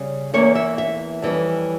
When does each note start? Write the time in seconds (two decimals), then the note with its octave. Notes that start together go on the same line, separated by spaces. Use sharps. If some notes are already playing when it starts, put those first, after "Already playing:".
Already playing: C#3 G3 C#4
0.33 E2 E3 A#3 C#4 C#5
0.55 E5
0.78 E5
1.22 F2 E3 G3 C#4